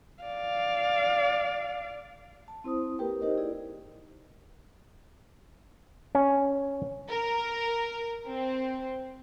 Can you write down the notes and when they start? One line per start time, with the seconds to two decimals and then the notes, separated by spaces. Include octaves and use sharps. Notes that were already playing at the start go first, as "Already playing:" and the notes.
0.23 D5 F5
2.48 A5
2.64 C4 E4 C5 D#6
2.99 A#3 G4 A#4 B4 G5
3.21 D#4 G4 A#4 C5 D#5
3.37 E4 G#4 D5
6.15 C#4
7.10 A#4
8.28 C4